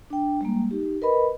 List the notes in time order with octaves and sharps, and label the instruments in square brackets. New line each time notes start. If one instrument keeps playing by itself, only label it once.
[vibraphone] D4 G5
G3 G#3 A#3
D#4 G4
A#4 B4 D#5 B5